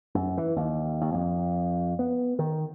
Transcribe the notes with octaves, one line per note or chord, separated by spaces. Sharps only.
F#2
E3
D#2
D#2
F2
B3
D#3